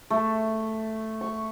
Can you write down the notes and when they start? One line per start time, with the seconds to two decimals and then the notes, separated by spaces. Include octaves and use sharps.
0.10 A3
1.21 C#6